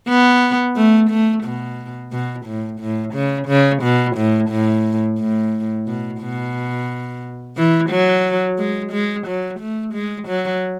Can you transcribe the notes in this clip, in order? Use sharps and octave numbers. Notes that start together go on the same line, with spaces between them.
B3
A3
A3
B2
B2
A2
A2
C#3
C#3
B2
A2
A2
A2
B2
B2
E3
F#3
G#3
G#3
F#3
A3
G#3
F#3